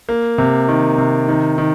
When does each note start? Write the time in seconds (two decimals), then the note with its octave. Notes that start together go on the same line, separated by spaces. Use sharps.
0.09 A#3
0.38 C3
0.68 D#3
0.98 C3
1.28 D#3
1.58 D#3